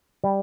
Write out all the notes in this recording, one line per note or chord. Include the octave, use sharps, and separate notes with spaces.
G3